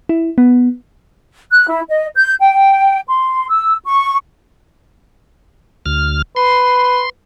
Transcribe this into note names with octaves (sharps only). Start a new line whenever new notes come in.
E4
B3
F#6
E4
D#5
G6
G5
C6
E6
C#6
D2 F6
B4 C6